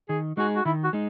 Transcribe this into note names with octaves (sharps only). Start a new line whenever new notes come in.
D#3 G#4
G#3 D#4 F#4 G#4
F#4
D#3 E4
F#4
G#3 D#4